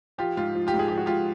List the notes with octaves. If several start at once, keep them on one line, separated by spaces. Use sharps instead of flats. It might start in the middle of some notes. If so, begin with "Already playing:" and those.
F3 F4 G4
G#2 F4
F3
F4 G4
G#2
G#4
F3 G4
F#4
G#2 F4 G4